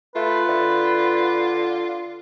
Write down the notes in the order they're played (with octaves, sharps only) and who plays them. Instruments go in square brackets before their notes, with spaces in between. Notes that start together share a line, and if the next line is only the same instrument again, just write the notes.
[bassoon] A3 [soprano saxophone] F4 [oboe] B4
[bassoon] D3